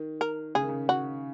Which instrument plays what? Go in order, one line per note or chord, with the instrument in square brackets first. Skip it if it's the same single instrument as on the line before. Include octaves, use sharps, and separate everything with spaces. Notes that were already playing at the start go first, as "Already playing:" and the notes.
Already playing: [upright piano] D#3
[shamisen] A#4
[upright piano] C#3 [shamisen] G#4
[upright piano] D#3
C#3
[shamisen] F#4